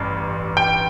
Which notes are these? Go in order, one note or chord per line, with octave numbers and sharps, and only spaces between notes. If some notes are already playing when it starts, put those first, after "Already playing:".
Already playing: A1 G2
G5